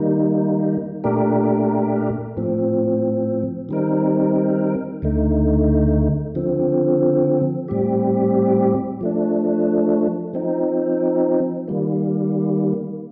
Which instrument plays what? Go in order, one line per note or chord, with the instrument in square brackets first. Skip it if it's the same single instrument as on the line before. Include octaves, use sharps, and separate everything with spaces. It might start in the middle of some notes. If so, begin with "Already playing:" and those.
Already playing: [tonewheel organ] D#3 G3 A#3 D#4
A#2 A3 D4 G4 A#4
A2 F3 C4
D#3 G3 C4 D#4 A#4
D2 D3 A3 D#4
D3 F3 C4
A2 G3 C4 G4
F3 A3 D4
F3 C4 D#4
D#3 G3 A#3